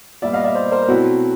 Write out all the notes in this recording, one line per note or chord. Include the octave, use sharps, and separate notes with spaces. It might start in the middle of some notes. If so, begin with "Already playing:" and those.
A#2 G3 B3 D5 E5
D#5 F5
D5 E5
C5 D5
A#4 C5
B2 F#3 A3 C4 E4 F#4